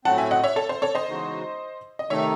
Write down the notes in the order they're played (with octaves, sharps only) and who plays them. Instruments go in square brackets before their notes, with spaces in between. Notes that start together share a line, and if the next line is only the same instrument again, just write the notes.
[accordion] A2 F#3 A3 C4 [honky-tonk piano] F#5 A5
[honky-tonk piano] E5 G#5
D#5 F#5
C#5 E5
A4 C#5
C5
A4 C#5
C5 D#5
[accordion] E2 C#3 G#3 D#4 F#4
[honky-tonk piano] D#5
[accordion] C3 D#3 A3 D#4 A4 [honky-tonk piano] C#5 E5